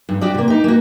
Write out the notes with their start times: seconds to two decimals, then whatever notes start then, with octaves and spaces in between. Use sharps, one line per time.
0.09 G2
0.21 F#4 G4 D5
0.35 C3 A#3
0.48 D#4 G4
0.64 A#3 F#4